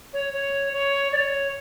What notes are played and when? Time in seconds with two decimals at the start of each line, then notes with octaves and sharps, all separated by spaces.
0.13 C#5
0.33 C#5
0.72 C#5
1.12 D5
1.16 C#5